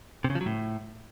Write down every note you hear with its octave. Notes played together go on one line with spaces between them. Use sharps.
C3
C#3
F3
F#3
A2